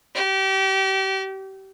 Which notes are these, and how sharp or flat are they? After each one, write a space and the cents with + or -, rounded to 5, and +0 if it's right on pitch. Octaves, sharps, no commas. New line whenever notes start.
G4 -30